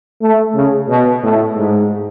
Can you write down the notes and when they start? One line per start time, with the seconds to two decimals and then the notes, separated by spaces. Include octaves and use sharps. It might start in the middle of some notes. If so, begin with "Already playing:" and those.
0.21 A3
0.55 C#3
0.89 B2
1.23 A2
1.56 G#2